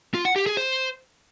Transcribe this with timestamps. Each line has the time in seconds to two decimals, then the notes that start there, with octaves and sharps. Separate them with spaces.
0.14 F4
0.25 F#5
0.36 G4
0.46 G#4
0.57 C5